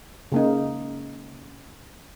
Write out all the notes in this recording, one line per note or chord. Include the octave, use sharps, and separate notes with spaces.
C#3 A#3 D#4